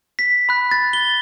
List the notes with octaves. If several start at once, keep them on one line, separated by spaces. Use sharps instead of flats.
B6
B5 F#6
A6
G7